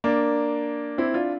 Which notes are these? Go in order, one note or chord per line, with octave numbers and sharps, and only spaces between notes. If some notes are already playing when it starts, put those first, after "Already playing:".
A#3 D4
C4 E4
D4 F4